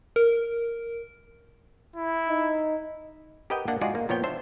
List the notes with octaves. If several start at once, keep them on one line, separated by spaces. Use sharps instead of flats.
A#4
E4
D#4
G4 A#4 B4 D#5 F#5 G5
A#3 D4 D5 F#5
G#3 D#4 F4 F#4 G#4 D5
A#3
A#2 F3 B3 C#5 G5
D4 C5 E5